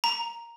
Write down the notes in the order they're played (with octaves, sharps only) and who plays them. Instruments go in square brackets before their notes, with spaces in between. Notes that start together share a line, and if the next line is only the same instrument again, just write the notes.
[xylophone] A#5